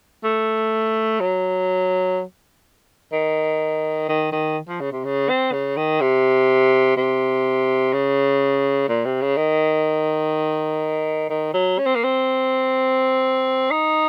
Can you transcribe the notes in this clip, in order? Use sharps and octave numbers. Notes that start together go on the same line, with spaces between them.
A3
F#3
D#3
D#3
D#3
F3
C#3
C3
C#3
C4
C#3
D#3
C3
C3
C#3
A#2
C3
C#3
D#3
D#3
F#3
C#4
C4
A#3
C4
D#4